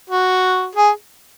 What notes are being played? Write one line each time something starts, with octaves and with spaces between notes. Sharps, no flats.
F#4
G#4